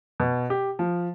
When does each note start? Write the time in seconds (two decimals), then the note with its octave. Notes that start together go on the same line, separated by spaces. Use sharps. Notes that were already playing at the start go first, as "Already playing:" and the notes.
0.20 B2
0.50 G4
0.79 F3